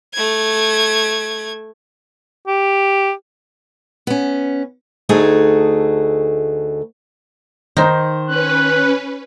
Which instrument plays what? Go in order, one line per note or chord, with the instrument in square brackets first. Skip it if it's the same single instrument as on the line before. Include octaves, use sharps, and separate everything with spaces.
[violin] A3 G#6
[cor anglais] G4
[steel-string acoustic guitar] B3 C#4
D2 A3 D#4 F#4 G#4
[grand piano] D#3 C5 [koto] D#4
[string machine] C#4 B4 [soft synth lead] F#6